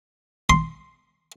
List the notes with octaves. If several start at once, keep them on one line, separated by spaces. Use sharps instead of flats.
C6